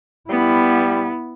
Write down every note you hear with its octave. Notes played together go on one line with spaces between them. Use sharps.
G3 B3 E4